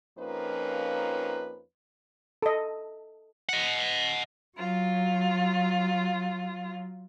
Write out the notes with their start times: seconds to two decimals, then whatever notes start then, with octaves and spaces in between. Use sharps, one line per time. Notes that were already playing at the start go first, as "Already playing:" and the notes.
0.18 F2 F3 A#3 C#4 D#4 B4
2.42 A4 D#5
3.49 D#5 F#5
4.56 F#3 F4